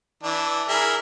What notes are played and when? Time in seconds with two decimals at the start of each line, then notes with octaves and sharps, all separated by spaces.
0.23 E3 D4
0.68 E4 G#4 A#4